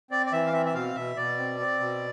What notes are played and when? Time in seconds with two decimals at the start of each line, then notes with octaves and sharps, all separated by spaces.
0.11 C4 D5
0.26 D5
0.32 E3 E5
0.46 F5
0.53 C4 E5
0.66 E5
0.74 B2 F5
0.95 B2 E5
1.17 B2 D5
1.38 C4
1.60 C4
1.80 B2